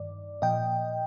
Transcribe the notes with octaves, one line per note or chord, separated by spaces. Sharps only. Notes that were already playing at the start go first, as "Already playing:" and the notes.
Already playing: G2 D#3 D5
A#2 F3 D#5 G5